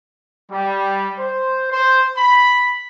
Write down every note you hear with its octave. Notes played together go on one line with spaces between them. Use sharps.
G3
C5
C5
B5